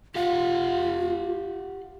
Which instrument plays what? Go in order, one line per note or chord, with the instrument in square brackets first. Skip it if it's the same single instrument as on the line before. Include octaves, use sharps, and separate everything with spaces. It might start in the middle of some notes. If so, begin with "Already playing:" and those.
[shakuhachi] F4 [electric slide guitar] G4 F5 F#5